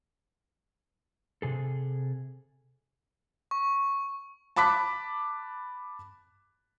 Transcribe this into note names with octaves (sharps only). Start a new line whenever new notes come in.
C3 G#4 A4
C#6
A5 B5 D6 F#6 B6